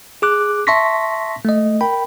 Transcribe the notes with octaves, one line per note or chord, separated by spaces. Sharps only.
G#4 D6 F#6
E5 A5 C6 C#6 A#6 B6
A3 D#5
A#4 G5 B5